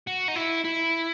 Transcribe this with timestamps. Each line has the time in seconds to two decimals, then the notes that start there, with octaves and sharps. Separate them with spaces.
0.07 F#4
0.28 D#4
0.36 E4
0.65 E4